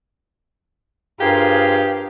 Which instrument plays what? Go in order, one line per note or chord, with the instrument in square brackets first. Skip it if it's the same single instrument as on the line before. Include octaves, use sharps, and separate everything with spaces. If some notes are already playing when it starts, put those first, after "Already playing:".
[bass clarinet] G2 [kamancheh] F4 A#4 [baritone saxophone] G4 [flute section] G#4 C5 F5